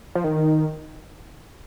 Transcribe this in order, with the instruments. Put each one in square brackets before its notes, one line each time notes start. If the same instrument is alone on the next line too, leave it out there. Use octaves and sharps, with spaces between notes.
[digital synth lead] F3
D#3